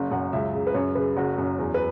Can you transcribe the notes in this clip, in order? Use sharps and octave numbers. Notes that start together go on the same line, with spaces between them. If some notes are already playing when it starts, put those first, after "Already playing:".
Already playing: F#1 F#2
F#2 F#5
C#2 E5
C#3
B4
F#2 C#5
C#3 B4
F#1 F#4
F#2
E2
B4